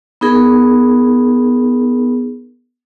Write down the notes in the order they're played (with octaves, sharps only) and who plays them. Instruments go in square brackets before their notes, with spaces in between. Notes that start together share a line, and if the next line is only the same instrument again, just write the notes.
[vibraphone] B3 D#4 G#4 A#4